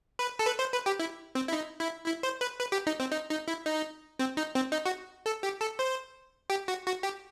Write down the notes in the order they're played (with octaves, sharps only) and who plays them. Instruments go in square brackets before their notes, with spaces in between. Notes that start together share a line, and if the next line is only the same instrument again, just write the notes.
[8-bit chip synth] B4
A4
B4
C5
B4
G4
E4
C4
E4
D#4
E4
E4
C5
B4
B4
G4
D#4
C4
D#4
D#4
E4
D#4
C4
D#4
C4
D#4
F#4
A4
G4
A4
C5
G4
F#4
F#4
G4